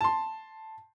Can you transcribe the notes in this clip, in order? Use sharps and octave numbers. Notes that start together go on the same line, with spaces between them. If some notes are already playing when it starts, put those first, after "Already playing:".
A5 C6